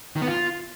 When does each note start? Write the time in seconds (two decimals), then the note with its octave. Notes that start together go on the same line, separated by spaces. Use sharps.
0.16 D#3
0.22 B3
0.28 F4